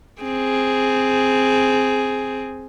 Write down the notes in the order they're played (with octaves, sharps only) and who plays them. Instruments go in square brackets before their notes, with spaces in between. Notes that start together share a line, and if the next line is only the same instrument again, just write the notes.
[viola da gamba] C4 G#4